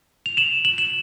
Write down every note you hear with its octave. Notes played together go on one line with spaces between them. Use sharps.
F7
E7 F#7
E7 F#7
E7 F#7